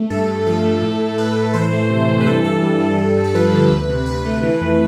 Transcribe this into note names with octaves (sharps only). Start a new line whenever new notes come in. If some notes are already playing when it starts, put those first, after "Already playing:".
Already playing: A3
G2 A4
G2
F3 A4
A3
A2
A2
A2 B4
A2
E3 C5
A3
C3
E3
B4
G2 A4
G2 A4
G3
G3
G2
G2
A4
F3 B4
D3
D2
C3
D2 B4
A3
E3
F2